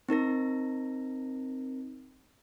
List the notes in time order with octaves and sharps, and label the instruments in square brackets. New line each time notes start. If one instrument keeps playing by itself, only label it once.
[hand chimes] C4 D#4 A#4 A#6